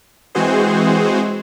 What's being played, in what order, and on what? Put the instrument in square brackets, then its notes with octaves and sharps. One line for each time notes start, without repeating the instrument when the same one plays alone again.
[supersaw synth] E3 G#3 C4 F#4 G#4 C5